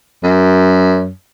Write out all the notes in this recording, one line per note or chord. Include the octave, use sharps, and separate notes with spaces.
F#2